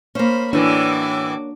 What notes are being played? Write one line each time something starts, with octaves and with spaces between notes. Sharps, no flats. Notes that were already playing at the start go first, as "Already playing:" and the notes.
A#3 C#4 C5 B5
A2 E3 D4 F#4 D6